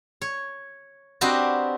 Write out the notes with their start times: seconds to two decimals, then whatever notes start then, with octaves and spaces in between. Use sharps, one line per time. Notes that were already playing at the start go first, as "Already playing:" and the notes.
0.22 C#5
1.21 C4 D4 F#4 G4 B4 D#5